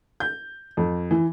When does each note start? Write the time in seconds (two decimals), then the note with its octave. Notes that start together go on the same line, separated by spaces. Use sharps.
0.20 G6
0.77 F2
1.11 E3